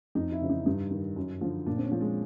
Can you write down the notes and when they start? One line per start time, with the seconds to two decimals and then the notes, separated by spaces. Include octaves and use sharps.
0.15 F2 D#4
0.32 E4
0.42 C#3 E3
0.50 D#4
0.66 G2 D#4
0.91 D#3
1.16 F#2
1.41 D3 F3
1.66 A#2 D4
1.77 C4
1.83 C#4
1.92 F3
2.01 G#3